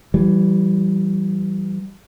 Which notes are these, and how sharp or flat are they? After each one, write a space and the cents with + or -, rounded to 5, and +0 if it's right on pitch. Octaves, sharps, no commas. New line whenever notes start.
E3 +15 G3 -25